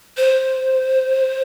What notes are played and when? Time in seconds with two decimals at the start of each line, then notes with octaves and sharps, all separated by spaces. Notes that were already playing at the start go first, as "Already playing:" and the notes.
0.17 C5